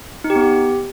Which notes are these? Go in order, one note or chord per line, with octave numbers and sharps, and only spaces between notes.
D#4
G4
B3
G4